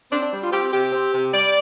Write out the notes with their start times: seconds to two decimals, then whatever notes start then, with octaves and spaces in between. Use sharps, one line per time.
0.10 C4 D4
0.22 D4
0.31 G3
0.42 F4
0.51 C4 G4
0.72 C3 G4
0.92 C4
1.13 C3
1.33 G3 D5